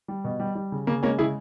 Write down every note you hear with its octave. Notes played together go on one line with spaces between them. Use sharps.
G3
B2
G3
G3
C#3
C#3 A#3
G#3 A#3 C#4
C#3 E4 G#4